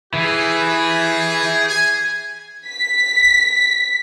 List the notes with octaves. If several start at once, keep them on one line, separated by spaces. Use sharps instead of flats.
E3 G4 G#4
G#5
B6